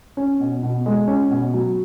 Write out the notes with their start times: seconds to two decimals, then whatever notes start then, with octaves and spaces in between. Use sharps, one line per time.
0.17 C#4
0.40 B2
0.63 B2
0.86 G#3
1.08 C#4
1.31 B2
1.54 F#3